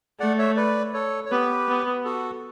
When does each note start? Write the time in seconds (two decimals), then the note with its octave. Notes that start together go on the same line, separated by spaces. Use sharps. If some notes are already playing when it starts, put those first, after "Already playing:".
0.20 A3 D5 F#5
0.38 C#5 E5
0.56 B4 D5
0.93 A4 C#5
1.25 C#5
1.30 B3 G4 B4
1.68 B3
2.04 F#4 A4